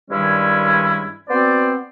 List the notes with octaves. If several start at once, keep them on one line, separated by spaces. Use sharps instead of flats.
G2 D#3 G3 G#3 C#4 E4
B3 C4 F#4 C5 D5